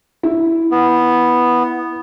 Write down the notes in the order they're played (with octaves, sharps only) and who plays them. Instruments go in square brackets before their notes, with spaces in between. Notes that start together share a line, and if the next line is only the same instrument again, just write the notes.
[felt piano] E4
[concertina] B3